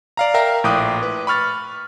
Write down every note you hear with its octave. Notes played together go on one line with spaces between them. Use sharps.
D5 F5 A#5
A#4 E5 F5 G5 A#5
A#1 A2 G5 D6 D#6 F#6
B4
B5 C#6 F6 A6